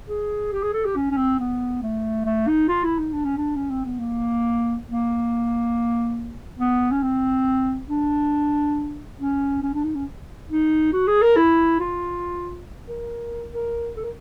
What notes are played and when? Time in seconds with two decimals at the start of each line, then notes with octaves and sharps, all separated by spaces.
0.08 G#4
0.52 G4
0.63 G#4
0.73 A4
0.85 G4
0.96 C#4
1.11 C#4
1.17 C4
1.39 B3
1.83 A3
2.26 A3
2.48 D#4
2.69 F4
2.84 E4
2.99 D#4
3.13 D4
3.25 C#4
3.37 D4
3.56 C#4
3.70 C4
3.85 B3
3.99 A#3
4.86 A#3
6.59 B3
6.92 C#4
7.03 C4
7.89 D4
9.19 C#4
9.63 C#4
9.74 D4
9.84 D#4
9.95 C#4
10.50 D#4
10.93 F#4
11.07 G#4
11.22 A#4
11.36 E4
11.80 F4
12.88 A#4
13.52 A#4
13.97 A4
14.04 A#4